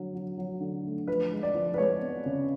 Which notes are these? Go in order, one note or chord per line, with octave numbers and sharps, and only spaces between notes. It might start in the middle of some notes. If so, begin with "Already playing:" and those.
Already playing: D3 F#3
F#3
F#3
D3
A3
F3 B4
G#3
D5
F3
B4
G#3 C#5
B3
C#3